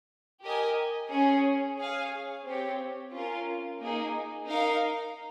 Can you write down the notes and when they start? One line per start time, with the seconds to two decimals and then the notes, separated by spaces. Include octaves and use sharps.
0.43 G4 A#4 D#5 G#5
1.10 C#4 G#4 C#5
1.78 G#4 C#5 F5
2.46 C4 G4 C#5
3.13 C#4 F4 A#4
3.80 A#3 D#4 G#4
4.48 D#4 A#4 F5